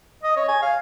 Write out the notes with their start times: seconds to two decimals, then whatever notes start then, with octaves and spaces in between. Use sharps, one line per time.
0.23 D#5
0.37 C#5
0.48 G#5
0.62 F5